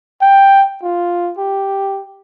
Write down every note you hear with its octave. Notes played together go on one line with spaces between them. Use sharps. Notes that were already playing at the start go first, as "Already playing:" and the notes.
G5
F4
G4